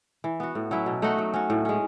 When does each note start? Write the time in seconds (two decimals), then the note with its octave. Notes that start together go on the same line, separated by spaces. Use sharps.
0.24 E3
0.40 B3 F#4
0.55 A2
0.71 F#3 C#4 E4
0.86 B2
1.02 A3 D#4 F#4
1.18 F#3
1.34 C#4 F#4
1.50 A2
1.65 G#3 C#4